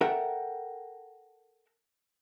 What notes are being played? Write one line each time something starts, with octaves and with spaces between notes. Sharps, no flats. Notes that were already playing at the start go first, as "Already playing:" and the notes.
A4 A#4 E5 F#5 G5